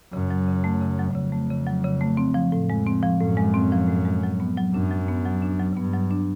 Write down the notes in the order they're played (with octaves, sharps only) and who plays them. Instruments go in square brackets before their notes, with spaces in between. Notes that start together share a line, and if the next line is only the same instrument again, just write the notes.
[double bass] F#2 [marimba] C#3
[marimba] F#3
C#3
A3
C#3
F#3
[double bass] F2 [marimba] C#3
[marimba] A3
C#3
F#3
C#3
A3
C4
F3
A2
[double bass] F2 [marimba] G#3
[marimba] C4
F3
[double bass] F#2 [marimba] A2
[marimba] G#3
C4
F3
A2
G#3
F#3
B3
F#3
[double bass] F#2 [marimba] D4
[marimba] F#3
B3
F#3
D4
F#3
[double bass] G2 [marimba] B3
[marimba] F#3
D4